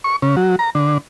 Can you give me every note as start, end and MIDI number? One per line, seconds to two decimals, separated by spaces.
0.04 0.16 85
0.22 0.36 49
0.37 0.56 54
0.59 0.70 82
0.75 0.98 50